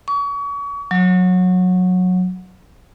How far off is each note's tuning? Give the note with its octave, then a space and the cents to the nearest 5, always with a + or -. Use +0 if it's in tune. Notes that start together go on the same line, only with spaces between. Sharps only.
C#6 +35
F#3 -20